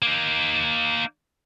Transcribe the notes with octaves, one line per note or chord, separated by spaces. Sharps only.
A#3 D#4